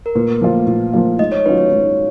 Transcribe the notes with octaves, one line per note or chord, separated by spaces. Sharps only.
A#4
A#2 B4
F3 A#3 F4
A#2
F3 A#3 F4
G#2 D#5
C#5
D#3 F#3 C#4 F4 B4
C#5
G#2